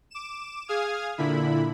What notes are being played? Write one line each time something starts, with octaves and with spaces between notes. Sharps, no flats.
D6 E7
G#4 F5 D#6 F6 G#6
A#2 D3 E4 B5